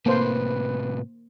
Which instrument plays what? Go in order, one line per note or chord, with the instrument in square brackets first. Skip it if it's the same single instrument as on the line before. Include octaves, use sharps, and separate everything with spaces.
[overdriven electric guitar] A2 C3 [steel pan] A#3 C5 [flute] B4